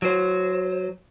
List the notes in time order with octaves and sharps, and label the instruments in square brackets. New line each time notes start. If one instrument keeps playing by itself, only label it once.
[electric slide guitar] F#3 C5